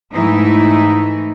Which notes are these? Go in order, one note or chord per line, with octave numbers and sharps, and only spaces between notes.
G#2 E3 A3 D#4 E4